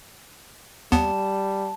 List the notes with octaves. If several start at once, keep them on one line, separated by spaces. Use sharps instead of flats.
D#2 G3 B3 A5